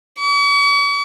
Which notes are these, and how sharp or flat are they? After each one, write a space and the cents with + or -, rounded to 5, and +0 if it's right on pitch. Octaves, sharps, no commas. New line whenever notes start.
C#6 +45